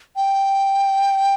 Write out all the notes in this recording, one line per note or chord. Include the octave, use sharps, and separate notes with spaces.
G5